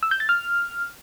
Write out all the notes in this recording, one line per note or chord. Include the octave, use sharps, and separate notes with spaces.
E6
G6
A6
F6